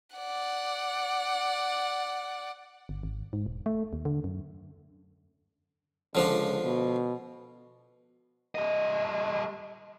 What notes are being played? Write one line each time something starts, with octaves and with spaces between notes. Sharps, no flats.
D5 F#5
G1
G#1
G#2
E1
A3
D#2
D3
F#2
C#2 D3 F3 D4
B2
G3 D#5